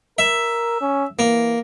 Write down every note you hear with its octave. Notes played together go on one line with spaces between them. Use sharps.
A#4 E5
C#4
E3 A#3